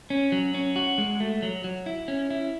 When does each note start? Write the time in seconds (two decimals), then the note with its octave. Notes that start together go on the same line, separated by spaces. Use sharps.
0.10 C#4
0.32 F#3
0.54 C#4
0.76 F#4
0.98 G#3
1.20 A3
1.42 F#3
1.64 F#3
1.86 E4
2.08 C#4
2.30 E4